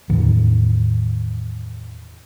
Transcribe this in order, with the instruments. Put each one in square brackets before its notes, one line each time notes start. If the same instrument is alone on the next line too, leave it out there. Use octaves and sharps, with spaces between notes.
[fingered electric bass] E2 A2 D#3 E3